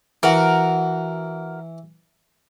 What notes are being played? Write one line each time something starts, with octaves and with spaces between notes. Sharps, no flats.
E3 F#4 A#4